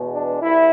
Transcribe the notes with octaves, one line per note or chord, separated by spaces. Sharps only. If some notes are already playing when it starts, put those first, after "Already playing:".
Already playing: E2 B2 G#3 B3
D4
C2 E4